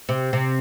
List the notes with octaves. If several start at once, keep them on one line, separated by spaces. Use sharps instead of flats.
C3
C3